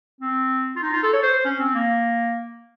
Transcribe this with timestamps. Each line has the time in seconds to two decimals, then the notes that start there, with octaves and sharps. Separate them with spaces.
0.21 C4
0.76 F4
0.82 D#4
0.93 F4
1.03 A4
1.13 C#5
1.23 C5
1.33 C5
1.45 C#4
1.60 C4
1.75 A#3